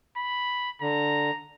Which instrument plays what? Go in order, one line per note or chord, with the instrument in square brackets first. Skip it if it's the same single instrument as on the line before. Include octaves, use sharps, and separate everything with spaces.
[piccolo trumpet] B5
[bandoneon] D3 [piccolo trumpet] A#5